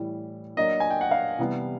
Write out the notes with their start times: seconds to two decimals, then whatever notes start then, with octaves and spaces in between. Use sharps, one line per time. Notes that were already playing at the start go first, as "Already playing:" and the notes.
Already playing: A2 E3 G3
0.57 F#3 A#3 D4 D#5
0.80 G#5
0.90 G5
1.01 F#5
1.11 F5
1.39 C3 E3 G3 B3 E4